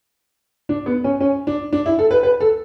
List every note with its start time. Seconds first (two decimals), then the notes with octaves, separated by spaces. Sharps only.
0.69 D4
0.86 B3
1.04 C#4
1.20 C#4
1.47 D4
1.73 D4
1.86 E4
1.99 A4
2.11 B4
2.23 B4
2.40 A4